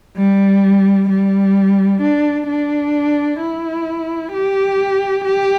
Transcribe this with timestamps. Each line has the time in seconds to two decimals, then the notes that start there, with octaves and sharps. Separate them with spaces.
0.17 G3
1.09 G3
2.02 D4
2.48 D4
3.40 E4
4.33 G4
5.25 G4